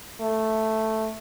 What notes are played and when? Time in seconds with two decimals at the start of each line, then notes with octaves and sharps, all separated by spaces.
0.21 A3